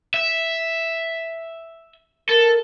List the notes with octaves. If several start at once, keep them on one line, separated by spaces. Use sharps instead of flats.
E5
A4 A#4